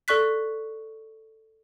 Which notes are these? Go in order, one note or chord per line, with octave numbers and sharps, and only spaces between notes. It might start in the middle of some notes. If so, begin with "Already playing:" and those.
A4 D5 C#6 F#6 B6